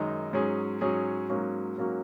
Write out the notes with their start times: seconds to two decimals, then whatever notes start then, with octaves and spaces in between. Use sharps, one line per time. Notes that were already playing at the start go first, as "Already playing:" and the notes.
Already playing: F#2 D#3 G#3 D#4
0.33 G#2 F#3 C#4 G#4
0.81 G#2 F#3 C#4 G#4
1.29 G#2 F#3 A#3 C#4 F#4
1.77 G#2 F#3 A#3 C#4 F#4